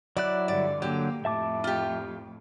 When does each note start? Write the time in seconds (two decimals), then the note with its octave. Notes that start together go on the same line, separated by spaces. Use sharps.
0.17 F#3 E4 D5 F#6
0.48 G2 D3 D5
0.82 D3 F#3 A#3 G4
1.25 F2 A2 E5 A5 D6
1.64 F4 G4